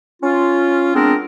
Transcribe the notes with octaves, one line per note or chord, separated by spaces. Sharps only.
C#4 F4
G#3 B3 C4 D4 A#4